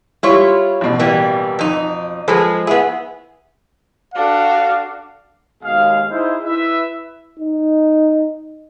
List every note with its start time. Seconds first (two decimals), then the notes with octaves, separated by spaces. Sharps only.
0.23 G3 E4 F4 C#5
0.81 A1 B2
0.99 E3 G3 A#3
1.59 F2 D#4
2.28 F3 G#3 G#4 A4 B4
2.67 B3 E4 G#4
4.14 D4 F#4 A4 F5
5.64 D#2 B2 G#3 G#4 F5
6.11 D#4 E4 G#4 C5
6.44 E4 B4 E5
7.39 D#4